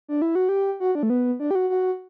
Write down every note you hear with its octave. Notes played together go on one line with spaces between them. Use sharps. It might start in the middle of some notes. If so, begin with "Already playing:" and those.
D4
E4
F#4
G4
F#4
D4
A3
B3
D4
G4
F#4
F#4